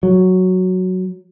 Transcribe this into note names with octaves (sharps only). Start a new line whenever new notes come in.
F#3